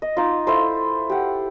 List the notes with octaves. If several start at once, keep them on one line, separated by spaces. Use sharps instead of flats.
D#5
D#4 F4
E4 A4 C5
G4 F#5